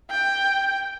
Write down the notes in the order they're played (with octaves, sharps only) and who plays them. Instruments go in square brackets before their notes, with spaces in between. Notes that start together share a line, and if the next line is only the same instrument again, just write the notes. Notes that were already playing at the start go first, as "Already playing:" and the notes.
[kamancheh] G5